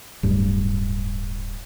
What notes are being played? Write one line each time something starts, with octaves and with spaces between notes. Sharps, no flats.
D1 G2